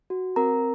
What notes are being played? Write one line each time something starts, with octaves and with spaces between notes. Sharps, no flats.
F#4
C4 A#4 A#5